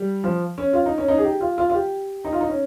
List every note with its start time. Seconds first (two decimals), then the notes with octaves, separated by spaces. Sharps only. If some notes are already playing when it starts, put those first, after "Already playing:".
Already playing: G3
0.24 F3
0.58 C#4
0.73 F4
0.86 D#4
0.98 C#4
1.08 D#4
1.18 G#4
1.24 G4
1.41 F4
1.58 F4
1.69 F4
1.74 G4
2.25 D#4
2.33 F4
2.41 D#4
2.49 C#4